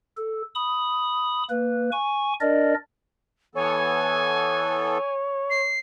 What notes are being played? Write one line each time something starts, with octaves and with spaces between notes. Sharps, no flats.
A4
B5 D#6
A#3 B4
G#5 C#6
D4 A#4 D5 D#5
E3 B3 A4 C#5 G#5
C7